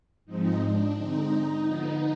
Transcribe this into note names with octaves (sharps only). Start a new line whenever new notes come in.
G#2 F3 G#3 C4 D#4
D4
D3 G#3 C4 D#4
D3 F3 B3